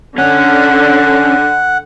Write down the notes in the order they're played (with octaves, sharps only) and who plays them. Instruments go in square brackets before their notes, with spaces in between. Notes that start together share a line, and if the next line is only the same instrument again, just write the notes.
[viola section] D3 [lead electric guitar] C#4 [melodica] F#5